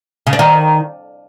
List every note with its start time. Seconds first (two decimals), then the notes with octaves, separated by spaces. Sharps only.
0.27 C#3
0.33 D4
0.39 D#3